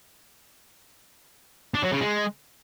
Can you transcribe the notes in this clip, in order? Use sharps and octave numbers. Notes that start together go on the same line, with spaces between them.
D4
F#3
C#3
G#3